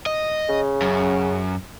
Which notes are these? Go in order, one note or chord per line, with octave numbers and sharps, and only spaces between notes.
D#5
C#3
F#2